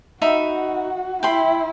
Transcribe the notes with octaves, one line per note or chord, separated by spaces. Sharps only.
D#4 F#4 E5 B5
E4 G5 B5 C6